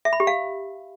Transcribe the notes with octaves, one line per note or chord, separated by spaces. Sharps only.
E5
B5
G4
F5